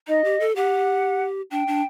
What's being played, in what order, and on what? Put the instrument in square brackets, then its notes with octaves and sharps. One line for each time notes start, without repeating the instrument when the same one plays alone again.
[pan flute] D#4 [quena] D#5
[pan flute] G4
A4
[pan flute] G4 [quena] F#5
[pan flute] D4 [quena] G5
[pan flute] D4